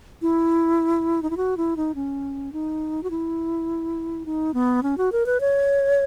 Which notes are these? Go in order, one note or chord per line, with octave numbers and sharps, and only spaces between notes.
E4
D#4
E4
F#4
E4
D#4
C#4
D#4
F#4
E4
D#4
B3
C#4
F#4
A#4
B4
C#5